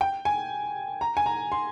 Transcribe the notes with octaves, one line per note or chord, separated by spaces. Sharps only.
G5
G#5
A#5
G#5
A#5
C6